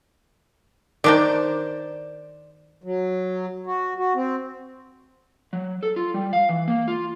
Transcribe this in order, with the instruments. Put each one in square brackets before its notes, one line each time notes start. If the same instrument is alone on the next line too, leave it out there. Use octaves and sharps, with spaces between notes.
[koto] D#3 D4 D#4 [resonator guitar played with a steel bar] C5 D5
[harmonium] F#3
F#4
F#4
C4
[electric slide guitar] F#3
A4
F4
G3
F5
E3
A#3
F4